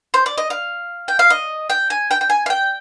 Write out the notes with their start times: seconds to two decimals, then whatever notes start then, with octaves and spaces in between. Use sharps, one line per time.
0.14 C5
0.26 D5
0.38 D#5
0.50 F5
1.08 G5
1.19 F5
1.30 D#5
1.70 G5
1.90 G#5
2.11 G5
2.21 G5
2.30 G#5
2.46 F5
2.50 G5